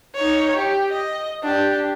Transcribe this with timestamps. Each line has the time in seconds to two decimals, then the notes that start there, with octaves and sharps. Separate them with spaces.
0.15 D#4 C#5
0.56 G4
0.89 D#5
1.44 D4 G4